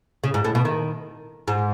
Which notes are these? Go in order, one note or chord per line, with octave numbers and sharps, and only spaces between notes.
C#3
G#2
A2
B2
D#3
G#2